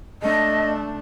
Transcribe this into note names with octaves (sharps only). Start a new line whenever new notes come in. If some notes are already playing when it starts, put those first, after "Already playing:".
A3 D4 D#5